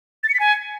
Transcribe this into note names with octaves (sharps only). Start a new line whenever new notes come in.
A6
C#7
B6
G#5